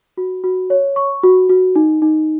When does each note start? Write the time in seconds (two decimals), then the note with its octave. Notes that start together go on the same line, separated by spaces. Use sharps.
0.17 F#4
0.44 F#4
0.70 C#5
0.96 C#6
1.23 F#4
1.49 F#4
1.76 D#4
2.02 D#4